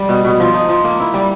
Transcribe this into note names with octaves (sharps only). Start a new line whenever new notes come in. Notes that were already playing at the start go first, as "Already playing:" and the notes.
Already playing: G3
B2
B2
F3
D#4
F3
A#3
E4
G3